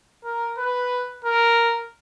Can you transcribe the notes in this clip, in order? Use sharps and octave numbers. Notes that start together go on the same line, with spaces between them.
A#4
B4
A#4